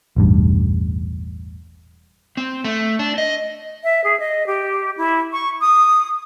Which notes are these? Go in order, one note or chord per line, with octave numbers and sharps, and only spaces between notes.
E1 A1 G2
C4
A3
D4
D#5
E5
G#4
D#5
G4
E4
C#6
D#6